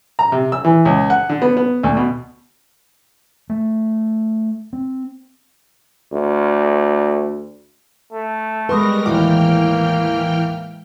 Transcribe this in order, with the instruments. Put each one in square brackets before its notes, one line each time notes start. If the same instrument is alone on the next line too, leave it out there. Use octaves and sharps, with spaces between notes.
[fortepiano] A#5
C3
E6
E3
C#2
F#5
D3
B3
B3
D2
B2
[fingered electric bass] A3
C4
[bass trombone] D2
[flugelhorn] A3
[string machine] G3 A#4 A#6 [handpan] G#3 B4 [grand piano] C6 C#6 D#6
[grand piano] D#2 A2 D6 [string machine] E3 G5 F6 [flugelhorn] A#3